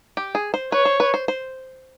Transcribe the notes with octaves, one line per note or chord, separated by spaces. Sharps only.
G4
G#4
C5
B4 C#5
C5
B4
C5
C5